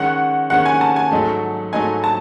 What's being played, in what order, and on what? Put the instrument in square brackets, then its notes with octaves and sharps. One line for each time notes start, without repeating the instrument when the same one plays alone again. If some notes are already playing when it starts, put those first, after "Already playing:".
Already playing: [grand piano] D#3 G#3 C#4 [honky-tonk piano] F#5
[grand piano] D#3 G#3 C#4 [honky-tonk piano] F#5
[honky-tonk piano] G#5
A5
G#5
[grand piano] G#2 F#3 A3 D#4 A4
[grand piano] G#2 F#3 A3 D#4 A4 [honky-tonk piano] G#5
[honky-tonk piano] A5